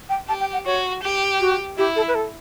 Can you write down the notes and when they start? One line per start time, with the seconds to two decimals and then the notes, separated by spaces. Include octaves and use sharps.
0.09 G5
0.28 G4 A5
0.40 G5
0.53 F#5
0.66 F#4 C#5
1.03 G4
1.40 F#4
1.78 E4 G4
1.96 A4
2.08 B4
2.15 A4